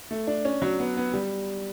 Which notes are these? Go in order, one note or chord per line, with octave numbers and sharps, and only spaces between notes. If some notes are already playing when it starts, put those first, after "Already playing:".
A3
D4
C#4
F#3
B3
B3
G3